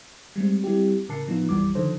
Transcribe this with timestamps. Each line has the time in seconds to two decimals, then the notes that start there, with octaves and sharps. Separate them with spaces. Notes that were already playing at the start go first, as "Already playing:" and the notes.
0.36 G3 G#3 C4
0.64 G3 C4 E4 G4
1.09 A2 C#3 A#4 A5 C7 C#7
1.27 A2 F3 B3 D#4 F4
1.49 A1 F2 E3 G3 D6
1.75 D3 D#3 F3 D#4 A4 C5